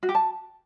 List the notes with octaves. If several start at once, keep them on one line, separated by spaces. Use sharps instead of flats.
F#4
G4
A5